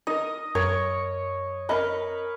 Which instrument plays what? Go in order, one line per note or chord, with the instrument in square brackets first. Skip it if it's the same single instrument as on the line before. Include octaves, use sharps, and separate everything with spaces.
[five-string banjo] D#4 A#4 [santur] D#5
[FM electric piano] F#2 [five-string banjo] A#4 [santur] C#5
[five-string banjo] C#4 D#5 [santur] A#4 B4